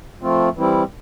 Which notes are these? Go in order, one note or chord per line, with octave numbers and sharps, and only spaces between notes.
F3 A3 C4 F4
E3 G3 C4 E4